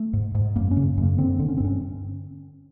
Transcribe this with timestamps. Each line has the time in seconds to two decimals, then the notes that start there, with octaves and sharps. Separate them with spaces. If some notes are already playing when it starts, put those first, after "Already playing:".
Already playing: A3
0.13 G#2
0.35 G#2
0.56 F#2 A#3
0.71 C#4
0.77 C#3
0.97 F#2 A#3
1.18 D3 C4
1.39 D3
1.49 C#4
1.57 C4
1.60 G2 C#4